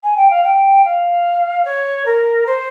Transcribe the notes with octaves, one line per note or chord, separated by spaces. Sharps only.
G#5
G5
F5
G5
F5
C#5
A#4
C5